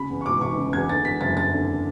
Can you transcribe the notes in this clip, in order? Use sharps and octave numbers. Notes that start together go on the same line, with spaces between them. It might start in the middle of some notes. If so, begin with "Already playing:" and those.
Already playing: C#3 B5
E2
C#6
E1 D6
E1 C#6
C#3
E2 G#6
D3 A6
E2 B6
F#1 A6
F#1 A6
D3